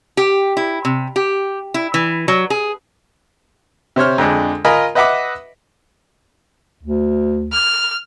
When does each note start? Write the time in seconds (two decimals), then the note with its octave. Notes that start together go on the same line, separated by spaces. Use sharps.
0.17 G4
0.57 E4
0.85 C3
1.16 G4
1.74 E4
1.94 E3
2.28 F#3
2.50 G#4
3.96 C3 C5 C#5 F6
4.18 F2 D3 G#3 D4
4.65 F4 A#4 D#5 G#5 A#5 B5
4.95 B4 D#5 E5 F#5 B5 D6
6.83 D2
7.52 F6